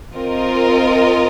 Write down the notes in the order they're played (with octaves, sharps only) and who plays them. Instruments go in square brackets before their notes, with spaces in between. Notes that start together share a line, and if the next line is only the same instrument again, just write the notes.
[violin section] C4 F4 A#4 D#5